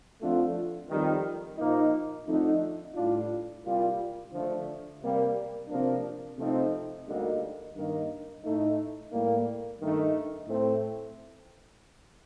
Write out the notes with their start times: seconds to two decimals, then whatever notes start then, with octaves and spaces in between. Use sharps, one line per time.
0.20 F2 D3 A3 D4 F4
0.89 F2 D#3 G3
1.57 A#2 F3 A#3 D#4
2.26 F2 D3 A3 D#4
2.95 A2 G3 D4 F4
3.63 C2 A#2 G3 A#3 F4
4.32 D3 F3 A3 D4
5.01 C3 G3 A#3
5.68 C3 F3 A#3 D4
6.37 C3 F3 A3 C4 D#4
7.06 D2 D3 G3 A#3 D#4
7.74 G2 D#3 A#3 D#4
8.43 A2 A3 D#4
9.11 A2 G3 A#3
9.79 G2 D#3 A3 D#4
10.48 A2 A3 C4